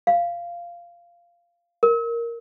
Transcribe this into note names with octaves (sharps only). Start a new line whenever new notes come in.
F5
A#4